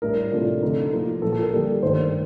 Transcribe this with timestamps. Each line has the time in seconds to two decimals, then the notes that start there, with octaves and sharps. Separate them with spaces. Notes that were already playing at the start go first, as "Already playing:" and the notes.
0.02 A2 G3 D4 A#4
0.31 C3 F3 A3 D4 F4
0.62 D3 A3 D#4
0.93 F3 A#3 F4
1.22 A#2 F3 A#3 A4
1.33 A4
1.42 A#4
1.53 D3 G3 A#3 D4 G4
1.82 G2 D#3 A3 D4 C5